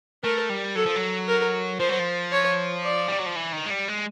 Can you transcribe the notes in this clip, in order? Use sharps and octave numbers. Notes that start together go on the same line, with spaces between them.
A3 A#4
G3
F#3 A4
F3
F#3
A#4
F3 C5
F#3
F3
C#5
D5
G3
F#3
F3
E3
D#3
G#3
G3
G#3